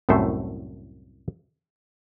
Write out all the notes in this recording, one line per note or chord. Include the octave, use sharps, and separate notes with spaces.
C2 F#2 A2 A3 C5